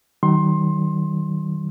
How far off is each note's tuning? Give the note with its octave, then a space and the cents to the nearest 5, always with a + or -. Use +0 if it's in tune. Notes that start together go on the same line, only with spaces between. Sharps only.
D#3 +0 F#3 +40 C6 +20